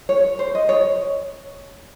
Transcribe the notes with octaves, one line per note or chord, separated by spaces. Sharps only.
C#5
C5
D#5
C#5